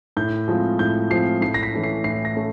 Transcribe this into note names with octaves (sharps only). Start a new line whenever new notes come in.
A2 G6
F3 G#3 C4 F4
A2 G6
F3 G#3 C4 F4 C7
A2 C7
A#6
B6
E3 A3 C#4
C7
A2 C7
A#6
A3 C#4